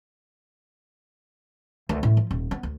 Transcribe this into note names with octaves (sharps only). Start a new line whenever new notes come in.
D2
A2
F3
D#1
B3
D2